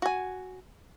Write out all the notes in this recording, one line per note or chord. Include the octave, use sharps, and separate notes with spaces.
F#4 G#5